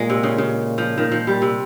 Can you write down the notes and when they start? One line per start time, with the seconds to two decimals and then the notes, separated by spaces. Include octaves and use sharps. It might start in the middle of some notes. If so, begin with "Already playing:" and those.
Already playing: A#2 G#3
0.10 C3
0.23 C#3
0.38 C#3
0.78 F3
0.98 A#2 D#3
1.11 F3
1.27 G3
1.42 C3